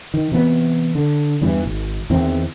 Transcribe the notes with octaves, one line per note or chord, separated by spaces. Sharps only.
D#3
C3 E3 B3
D3
E2 G2 E3
G#1
E2 D#3 E3 C4